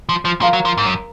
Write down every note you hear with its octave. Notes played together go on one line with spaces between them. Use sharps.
F3
F3
F3 A#4 F5 A#5
F#3
F3
G#2
F#2